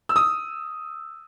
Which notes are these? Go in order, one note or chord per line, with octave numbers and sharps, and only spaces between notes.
E6
D#6